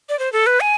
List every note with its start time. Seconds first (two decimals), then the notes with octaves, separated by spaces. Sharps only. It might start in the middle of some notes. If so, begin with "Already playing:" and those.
0.09 D5
0.19 C5
0.33 A4
0.47 B4
0.60 G#5